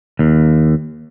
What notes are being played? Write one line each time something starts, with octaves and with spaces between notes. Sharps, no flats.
D#2